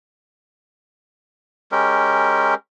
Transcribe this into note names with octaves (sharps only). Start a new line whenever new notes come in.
G#3 C#4 G4 A#4